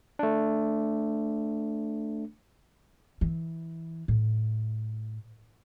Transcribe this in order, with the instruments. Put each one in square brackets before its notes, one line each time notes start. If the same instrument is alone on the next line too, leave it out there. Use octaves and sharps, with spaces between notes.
[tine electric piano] A3 D4
[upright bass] E3
A2